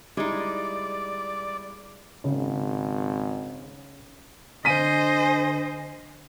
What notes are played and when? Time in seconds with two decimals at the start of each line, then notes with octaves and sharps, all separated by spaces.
0.17 G3 G#3 D#4 E4 D5
2.24 G#1 C#3
4.65 D3 C5 D#5 G#5 B6 D#7